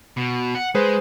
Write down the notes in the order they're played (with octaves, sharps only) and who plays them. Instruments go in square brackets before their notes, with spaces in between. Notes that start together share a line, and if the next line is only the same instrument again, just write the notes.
[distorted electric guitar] B2
F#5
[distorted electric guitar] G#3 [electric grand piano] G#4 B4 C5